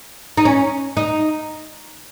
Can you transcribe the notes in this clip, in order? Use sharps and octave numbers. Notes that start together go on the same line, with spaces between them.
D#4
C#4
D#4